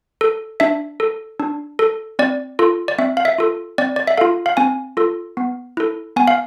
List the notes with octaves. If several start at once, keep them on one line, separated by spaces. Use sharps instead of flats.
A4
D4 E5
A4
D4
A4
C4 D5
F4 A4
D5
C4 E5
F5
E5
F4 A4
C4 D5
D5
E5
F4 A4 F5
F5
C4 G#5
F4 A4
B3
E4 A4
B3 G#5
F5